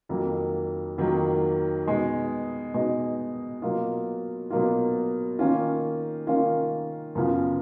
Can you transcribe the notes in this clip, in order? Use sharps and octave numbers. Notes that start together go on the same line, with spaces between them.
F2 D#3 F#3 A#3
F2 D#3 F#3 A#3
B2 G#3 D#4
B2 G#3 D#4
B2 F#3 A#3 F4
B2 F#3 A#3 F4
D#3 A#3 C#4 F4
D#3 A#3 C#4 F4
F#2 C#3 F3 B3 F4